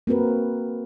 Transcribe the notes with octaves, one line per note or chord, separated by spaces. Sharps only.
A#3 C4 F#4 A#4 B4